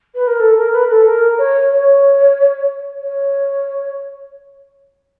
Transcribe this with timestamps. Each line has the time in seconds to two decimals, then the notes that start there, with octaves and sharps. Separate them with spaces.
0.15 B4
0.27 A#4
0.40 A4
0.57 A#4
0.73 B4
0.90 A4
1.06 A#4
1.38 C#5
1.72 C#5
3.02 C#5